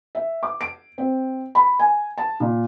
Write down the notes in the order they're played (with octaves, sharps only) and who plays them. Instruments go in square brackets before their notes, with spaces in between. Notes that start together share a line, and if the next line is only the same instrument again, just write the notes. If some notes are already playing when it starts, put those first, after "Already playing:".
[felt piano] E5
D6
D7
C4
B5
G#5
A5
A#2